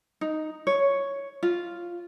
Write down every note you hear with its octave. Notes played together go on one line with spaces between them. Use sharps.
D#4
C#5
F4